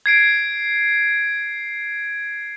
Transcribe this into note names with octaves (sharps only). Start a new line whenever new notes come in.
G#6 C7 D7